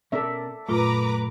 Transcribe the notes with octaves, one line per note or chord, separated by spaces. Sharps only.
B2 C#4 A4 A#4 D5 E5
F#2 A#2 A3 F4 B4 A#5 D6